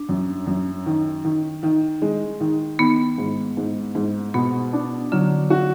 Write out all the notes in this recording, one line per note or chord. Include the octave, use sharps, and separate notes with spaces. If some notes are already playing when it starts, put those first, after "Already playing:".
Already playing: D4
F#2
F#2
D#3
D#3
D#3
G#3
D#3
D#3 B3
G#2
G#2
G#2
B2 B3
D4
D3 F#3
F#4